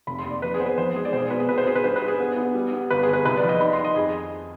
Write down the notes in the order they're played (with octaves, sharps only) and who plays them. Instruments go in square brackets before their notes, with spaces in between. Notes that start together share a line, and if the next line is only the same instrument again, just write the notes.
[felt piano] F1 B5
C6
D#2
D5
F3 B4
G#4
B3 C5
B4
F3 C5
G#3 G#4
D5
B1 C5
G#4
B2 B4
G#4
B2 B4
C5
B2 G#4
B4
G2 C5
B4
G2
G#4
B3
B3
G3
B3
G1 B4
G1 G#4
B4
C2 B4
D5
F3
D#5
D#3 B5
C6
D#3
D#5
F2 G#4